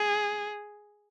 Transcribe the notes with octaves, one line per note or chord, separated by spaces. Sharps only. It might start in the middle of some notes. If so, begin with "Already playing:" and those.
Already playing: G#4